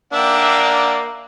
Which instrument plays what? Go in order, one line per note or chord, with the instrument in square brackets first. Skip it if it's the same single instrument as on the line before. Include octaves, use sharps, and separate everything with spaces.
[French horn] A#3 [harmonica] D4 D5 F#5 [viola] E5 G5